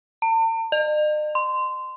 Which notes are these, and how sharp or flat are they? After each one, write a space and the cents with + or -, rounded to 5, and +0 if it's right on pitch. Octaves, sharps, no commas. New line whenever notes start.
A5 +45
D#5 -45
C6 -15